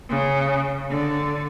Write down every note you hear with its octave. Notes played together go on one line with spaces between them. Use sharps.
C#3
D3